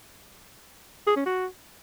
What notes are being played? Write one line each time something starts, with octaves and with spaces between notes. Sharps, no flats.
G#4
C#4
F#4